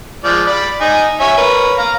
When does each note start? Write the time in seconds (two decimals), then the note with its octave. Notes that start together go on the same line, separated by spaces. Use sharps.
0.24 F3 G#3 D5
0.47 D5 B5
0.81 D#4 G#5
1.20 C#5 E5 G#5
1.37 A#4 B4 C#5
1.78 F5 A#5